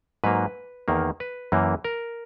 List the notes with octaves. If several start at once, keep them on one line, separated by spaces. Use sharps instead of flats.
G#2 F#3 A#3 B4
E2 D#3 A#3
B4
F#2 E3 A#3
A#4